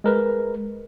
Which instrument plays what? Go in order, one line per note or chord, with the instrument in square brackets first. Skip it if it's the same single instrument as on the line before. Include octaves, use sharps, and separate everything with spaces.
[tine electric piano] G#3 A#4 B4